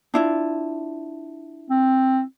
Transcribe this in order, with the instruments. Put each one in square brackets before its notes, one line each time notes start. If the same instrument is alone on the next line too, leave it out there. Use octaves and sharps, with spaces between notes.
[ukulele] D4 E4 F4
[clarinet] C4